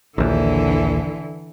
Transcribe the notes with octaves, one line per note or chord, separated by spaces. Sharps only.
A#1 D#2 D3 E3